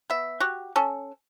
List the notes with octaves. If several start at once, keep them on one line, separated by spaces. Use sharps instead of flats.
B3 E5
F#4 G4
C#4 A4